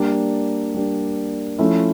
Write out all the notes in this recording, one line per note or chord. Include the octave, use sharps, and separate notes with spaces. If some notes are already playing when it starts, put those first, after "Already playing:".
Already playing: G3 A#3 D4
G3 A#3 D4
F3 A3 C#4 E4